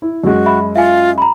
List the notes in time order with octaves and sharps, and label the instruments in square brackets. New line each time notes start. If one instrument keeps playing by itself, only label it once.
[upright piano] E4
[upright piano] F#2 G#3 [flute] F#4
[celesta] E5 B5
[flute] F4 [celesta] E5 F5 G#5
[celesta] A#5 B5